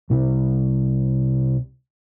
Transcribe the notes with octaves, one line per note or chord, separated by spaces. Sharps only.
C2 C3